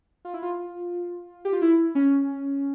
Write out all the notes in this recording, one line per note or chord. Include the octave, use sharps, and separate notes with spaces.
F4
E4
F4
G4
F4
E4
C#4